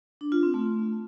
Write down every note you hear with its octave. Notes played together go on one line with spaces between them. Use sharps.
D4
F4
C4
A3